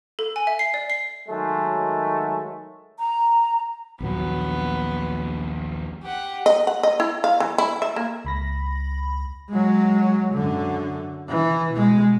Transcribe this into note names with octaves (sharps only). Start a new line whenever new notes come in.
A4
G#5
E5
C7
D5
C7
D#3 F#3 G#3 A3
A#5
A#1 D#2 F#3 B3
G4 F#5
D#5
F#5
D#5
E4
F5
E3
E4
E5
A#3
C#2 B5 A#6
F#3 G#3
F#2 D3
E3
B2 G#3